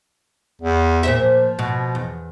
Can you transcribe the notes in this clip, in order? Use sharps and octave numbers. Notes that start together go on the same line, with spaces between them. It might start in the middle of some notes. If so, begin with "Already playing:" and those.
E2
A#2 C5 E5
F3
B2
E2